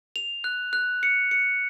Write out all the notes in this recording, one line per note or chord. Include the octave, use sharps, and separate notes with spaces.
F7
F#6
F#6
C#7
C#7